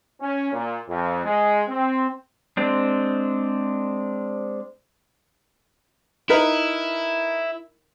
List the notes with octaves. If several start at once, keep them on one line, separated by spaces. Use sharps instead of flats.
C#4
A#2
F2
G#3
C4
G#3 C4 D4
D#4 E4 A#4 B4